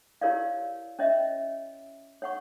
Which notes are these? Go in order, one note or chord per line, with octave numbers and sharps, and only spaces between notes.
E4 G4 A#4 C#5 D5 F5
C#4 C#5 D#5 E5
C#5 F#5 C#6